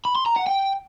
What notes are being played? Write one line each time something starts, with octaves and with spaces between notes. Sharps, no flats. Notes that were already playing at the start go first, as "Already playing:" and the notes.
B5
C6
A#5
F#5
G5